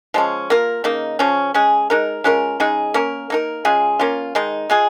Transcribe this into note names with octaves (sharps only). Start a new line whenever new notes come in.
F3 G#3 C#4
A#3 F4 A#4
C#3 A#3 D#4
C#3 F3 C#4
G#3 C#4 G#4
G#3 D#4 A#4
G#3 C#4 F4 A#4
C#3 G#3 D#4 G#4
A#3 C#4 A#4
A#3 D#4 A#4
C#3 G#3 F4 G#4
A#3 C#4 F4
D#3 G#3 D#4
G#3 F4 G#4